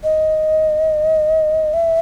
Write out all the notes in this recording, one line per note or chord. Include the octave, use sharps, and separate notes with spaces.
D#5
E5